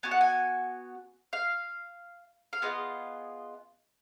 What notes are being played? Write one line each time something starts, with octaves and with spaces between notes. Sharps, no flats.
B3 F#4 G#5
F#5
G#5
F5
F5
B3 F4 G#4 D#5